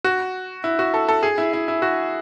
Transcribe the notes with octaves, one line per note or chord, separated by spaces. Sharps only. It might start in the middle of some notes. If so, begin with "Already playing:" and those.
F#4
E4
F#4
A4
A4
G#4
E4
E4
E4
F#4